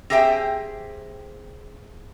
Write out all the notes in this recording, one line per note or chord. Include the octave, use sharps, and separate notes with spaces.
C4 G4 G#4 E5 G5